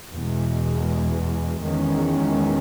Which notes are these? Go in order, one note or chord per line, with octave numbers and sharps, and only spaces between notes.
E2 B2 G#3
E2 D#3 G#3 C#4